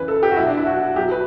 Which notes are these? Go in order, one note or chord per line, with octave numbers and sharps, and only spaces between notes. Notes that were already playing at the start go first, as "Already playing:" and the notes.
Already playing: C#3 E3 B4
A4
G4
F#4
B2 F#3 E4
D4
E4
F#4
B2 F#3 G4
B4